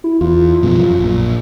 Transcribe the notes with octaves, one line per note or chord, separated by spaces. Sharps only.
E4
E2 F4
F#2 B2 F3
F#2
A#1